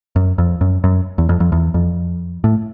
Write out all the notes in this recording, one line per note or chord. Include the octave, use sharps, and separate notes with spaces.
F#2
F2
F#2
F#2
E2
F2
F2
E2
F2
A2